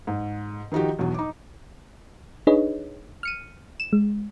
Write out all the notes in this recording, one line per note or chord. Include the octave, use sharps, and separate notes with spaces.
G#2
D#3 F3 D#4 F#4 G4
B1 E2 B2 F#3
D#4 D6
D4 D#4 G#4 B4 C#5 D#5
F6 C#7 D#7
E7
G#3